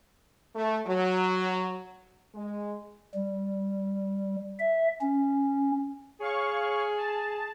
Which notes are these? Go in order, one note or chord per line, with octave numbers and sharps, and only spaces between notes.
A3
F#3
G#3
G3
E5
C#4
G#4 C#5 F5 C#6
A5